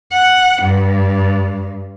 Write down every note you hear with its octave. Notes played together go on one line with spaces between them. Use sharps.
F#5
G2